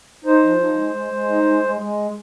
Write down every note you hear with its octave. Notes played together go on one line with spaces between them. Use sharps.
D#4 C5
F3
D#4
G#3
G#3
G#3
D#4
G#3
G#3
G#3